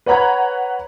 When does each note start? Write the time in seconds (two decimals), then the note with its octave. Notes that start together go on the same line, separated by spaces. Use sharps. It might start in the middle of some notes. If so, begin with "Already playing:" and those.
0.06 B4 C#5 F#5 A#5 B5 G#6